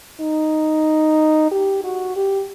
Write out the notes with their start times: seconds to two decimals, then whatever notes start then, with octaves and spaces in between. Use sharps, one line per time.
0.20 D#4
1.51 G4
1.84 F#4
2.16 G4